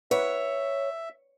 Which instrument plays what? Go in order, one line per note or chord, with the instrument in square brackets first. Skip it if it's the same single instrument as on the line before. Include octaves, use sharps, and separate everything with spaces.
[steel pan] B4 F#5 [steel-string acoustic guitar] C#5 [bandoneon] E5